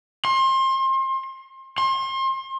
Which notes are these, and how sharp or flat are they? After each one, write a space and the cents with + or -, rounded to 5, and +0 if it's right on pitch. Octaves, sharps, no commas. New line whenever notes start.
C6 +30
C6 +35